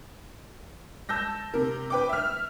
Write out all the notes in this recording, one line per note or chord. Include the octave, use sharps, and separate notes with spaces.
A5 E6 G6 A#6
C3 A#4
B4 G5 D6
E5 F6